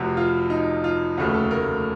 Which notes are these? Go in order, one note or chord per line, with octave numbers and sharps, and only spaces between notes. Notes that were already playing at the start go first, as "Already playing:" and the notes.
Already playing: F1 F2 C3 F#4
F4
D#4
F4
F1 D#2 C#3 A3 F#4
A4
A#4